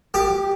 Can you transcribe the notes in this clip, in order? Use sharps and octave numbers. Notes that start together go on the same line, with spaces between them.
G4